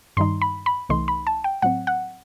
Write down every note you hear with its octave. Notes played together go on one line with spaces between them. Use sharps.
G2 D#3 G3 D#4 C6
B5
B5
C2 C3 E3 A3 D#4 C6
B5
A5
G5
A2 F#3 C4 F#5
F#5